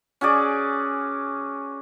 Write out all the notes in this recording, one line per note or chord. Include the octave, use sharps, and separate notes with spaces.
C#4 F#4 G#4 D5